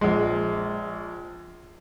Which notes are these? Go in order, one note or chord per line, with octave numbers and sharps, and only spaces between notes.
A#1 G#3